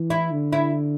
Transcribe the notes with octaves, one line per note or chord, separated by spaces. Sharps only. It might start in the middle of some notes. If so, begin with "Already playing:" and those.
Already playing: E3
E4
D3
E4